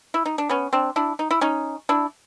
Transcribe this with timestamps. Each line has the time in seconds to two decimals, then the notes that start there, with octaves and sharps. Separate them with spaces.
0.14 E4
0.26 D#4
0.38 D4
0.49 B3 C#4
0.73 C4 D4
0.96 D4 E4
1.19 D#4
1.31 E4
1.41 C#4 D#4
1.89 D4 E4